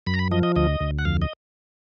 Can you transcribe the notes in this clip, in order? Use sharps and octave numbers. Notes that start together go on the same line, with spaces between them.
F#2 B5
A#5
B5
F3 D#5
D#5
D2 D#5
D2
F#5
F2 F5
D#5